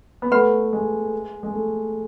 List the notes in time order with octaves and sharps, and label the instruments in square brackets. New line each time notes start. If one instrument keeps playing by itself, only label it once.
[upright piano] B3
[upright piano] A3 [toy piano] B4 F#5 B5
[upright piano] G#3
G#3
A3